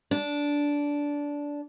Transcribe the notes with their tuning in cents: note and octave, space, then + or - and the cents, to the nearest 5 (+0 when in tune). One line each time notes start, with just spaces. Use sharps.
D4 -15